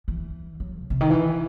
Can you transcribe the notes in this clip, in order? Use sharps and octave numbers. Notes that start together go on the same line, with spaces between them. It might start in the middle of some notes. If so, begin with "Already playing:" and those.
E3
F#3
B2
C3
D#3
E3